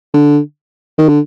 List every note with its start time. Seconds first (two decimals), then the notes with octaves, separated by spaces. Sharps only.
0.14 D3
0.98 D#3
1.09 D3